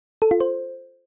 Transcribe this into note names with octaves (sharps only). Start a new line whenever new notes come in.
A4
F4
C5